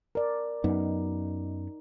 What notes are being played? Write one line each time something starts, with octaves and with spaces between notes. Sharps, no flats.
A#4 D5
F#2 B3 D#4